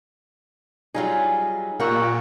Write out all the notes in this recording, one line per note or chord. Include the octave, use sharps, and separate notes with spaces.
F#3 G3 D#4 F4 G#4
A#2 F4 G4 A#4 F#5 C#6 E6